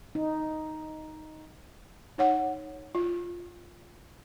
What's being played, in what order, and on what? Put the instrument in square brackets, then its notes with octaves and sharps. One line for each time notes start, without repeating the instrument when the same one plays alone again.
[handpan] D#4
[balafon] D#4 C#5 F#5
F4